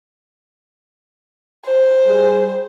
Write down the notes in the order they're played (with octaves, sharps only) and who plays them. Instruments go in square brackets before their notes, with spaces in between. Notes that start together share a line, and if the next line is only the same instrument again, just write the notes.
[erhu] C5
[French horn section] G3 G#4